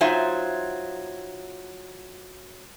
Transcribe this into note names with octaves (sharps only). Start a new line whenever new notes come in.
F#3 D#4 F4 C5 E5 G#5